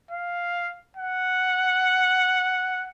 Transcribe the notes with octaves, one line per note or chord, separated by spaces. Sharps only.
F5
F#5